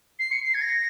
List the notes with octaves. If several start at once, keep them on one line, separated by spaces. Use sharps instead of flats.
C7
C#7
C7
G#6
A#6